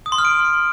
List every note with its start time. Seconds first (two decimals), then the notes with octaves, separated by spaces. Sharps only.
0.06 D#6
0.12 C6
0.18 F6
0.25 D7